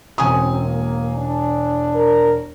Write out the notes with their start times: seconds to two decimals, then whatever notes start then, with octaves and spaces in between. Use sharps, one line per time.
0.18 E1 F#2 C4 G#5 D#6
0.63 A#3
1.16 D4
1.95 A#4